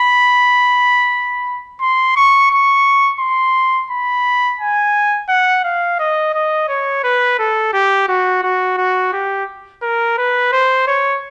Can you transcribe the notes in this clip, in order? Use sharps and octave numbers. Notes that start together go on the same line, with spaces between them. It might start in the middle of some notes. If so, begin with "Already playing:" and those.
Already playing: B5
C6
C#6
C#6
C6
B5
G#5
F#5
F5
D#5
D#5
C#5
B4
A4
G4
F#4
F#4
F#4
G4
A#4
B4
C5
C#5